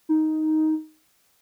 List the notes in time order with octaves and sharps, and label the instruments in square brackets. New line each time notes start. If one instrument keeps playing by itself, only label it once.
[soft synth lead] D#4